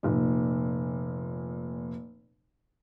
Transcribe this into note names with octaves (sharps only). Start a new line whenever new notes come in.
F1 A#2